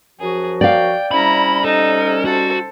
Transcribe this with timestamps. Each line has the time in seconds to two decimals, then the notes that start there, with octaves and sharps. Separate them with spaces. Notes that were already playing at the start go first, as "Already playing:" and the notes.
0.20 F#2 F3 F#4 G#4
0.61 D5 F5 G5
1.11 C3 G3 C#4 E4 A#5 B5
1.64 D#4 A4
2.25 F#4 A4 C5